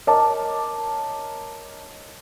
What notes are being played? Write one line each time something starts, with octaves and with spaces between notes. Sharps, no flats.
A#4 C#5 D#5 A5 D6